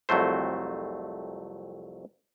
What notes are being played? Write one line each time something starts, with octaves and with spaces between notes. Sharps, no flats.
C2 F2 F#3 A3 C5